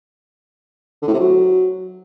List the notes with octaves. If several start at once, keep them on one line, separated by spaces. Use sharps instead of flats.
D3
A2
C3
F#3